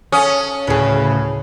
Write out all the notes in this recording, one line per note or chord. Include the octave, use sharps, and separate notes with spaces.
C#4 A4 F5 D#6
D2 A2 C#3 G#4 B4